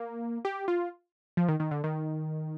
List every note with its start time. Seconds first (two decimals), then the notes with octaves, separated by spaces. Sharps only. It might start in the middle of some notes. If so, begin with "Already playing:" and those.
Already playing: A#3
0.45 G4
0.68 F4
1.37 F3
1.48 D#3
1.60 D#3
1.71 D3
1.84 D#3